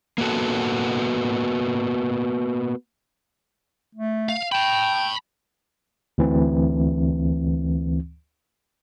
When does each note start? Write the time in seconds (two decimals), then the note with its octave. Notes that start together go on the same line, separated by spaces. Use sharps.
0.18 A#3 B3 F#4 A4
3.95 A3
4.29 F5
4.52 G5 A5 B5
6.18 D2 E3 C4